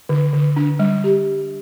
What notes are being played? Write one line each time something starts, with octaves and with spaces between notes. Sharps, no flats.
D3
D3
D4
G3
G4